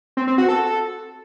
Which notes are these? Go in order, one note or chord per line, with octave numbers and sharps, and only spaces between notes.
C4
C4
F#4
A4